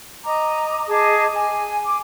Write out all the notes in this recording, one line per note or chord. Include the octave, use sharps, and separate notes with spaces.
D#5 A#5 D6
G#4 D#5 A5 D6
G#5
D6